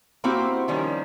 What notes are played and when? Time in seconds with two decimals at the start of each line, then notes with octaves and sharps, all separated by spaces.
0.24 A#3 C4 E4 F#4 G4 C5
0.68 D#3 F3 G3 C#4